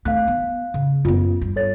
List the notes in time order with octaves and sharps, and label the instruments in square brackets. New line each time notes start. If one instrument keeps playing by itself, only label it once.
[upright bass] A3 C4 [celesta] F5 F#6
[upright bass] B3
C#3
[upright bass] F#2 B3 [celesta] F4
[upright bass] G2
[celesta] A4 C#5 A6